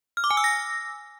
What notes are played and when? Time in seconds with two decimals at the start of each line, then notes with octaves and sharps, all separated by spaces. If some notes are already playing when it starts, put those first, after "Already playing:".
0.17 F6
0.24 D6
0.31 G#5
0.37 E6
0.44 A#6